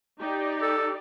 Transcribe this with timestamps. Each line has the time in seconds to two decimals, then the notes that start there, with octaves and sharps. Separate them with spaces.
0.19 D#4 G4 D5
0.62 A4